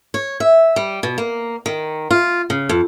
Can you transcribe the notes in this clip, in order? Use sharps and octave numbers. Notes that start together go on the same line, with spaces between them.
C#5
E5
G3
B2
A#3
D#3
F4
C#3
F2